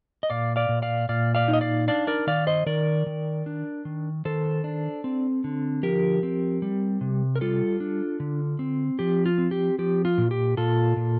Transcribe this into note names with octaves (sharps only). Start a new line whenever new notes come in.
D#5
A#2 D5 F5
D5 F5
A#2
D5 F5
A#2 D5 F5
D5 F5
D#4
D#5
D5 F5
D4 D5 F5
A#4 D5
D#3 D5 F5
C5 D#5
D#3 A#4 D5
D#3
D4
D#3
D#3 A4 C5
D4
C4
D3
F3 G4 A#4
C4
G3
C3
A#4
G3 F4 A4
D4
D3
C4
F3 G4
F4
C4
G4
F3 G4
F4
A#2
G4
A#2 F4 A4
A#2